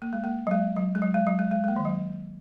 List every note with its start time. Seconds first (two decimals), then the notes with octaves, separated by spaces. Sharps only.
0.02 A#3
0.13 G#3
0.24 A#3
0.47 F#3
0.51 G#3
0.76 F#3
0.95 G#3
1.02 F#3
1.14 G#3
1.27 F#3
1.39 G#3
1.51 G#3
1.64 G#3
1.68 A#3
1.76 D#3
1.85 F#3